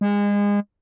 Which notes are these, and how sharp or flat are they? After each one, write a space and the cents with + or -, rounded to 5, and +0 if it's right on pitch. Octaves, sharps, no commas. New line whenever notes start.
G#3 -30